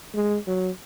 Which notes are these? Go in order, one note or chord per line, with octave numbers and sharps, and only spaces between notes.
G#3
F#3